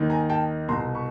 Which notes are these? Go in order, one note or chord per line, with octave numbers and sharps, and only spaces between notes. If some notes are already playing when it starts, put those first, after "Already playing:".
Already playing: D#2 D#3
G#5 A#5
G5 A5
C2 B2 A#5 C6
B5 C#6